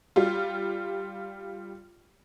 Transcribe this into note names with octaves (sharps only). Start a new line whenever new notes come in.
G3 F4